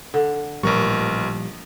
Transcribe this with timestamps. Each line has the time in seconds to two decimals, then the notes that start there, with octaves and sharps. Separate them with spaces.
0.14 D3
0.63 A1 A#2 F3 G3 A#4 C#6